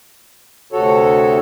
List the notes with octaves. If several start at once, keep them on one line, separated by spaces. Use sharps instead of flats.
D2 C3 F#4 A4 C#5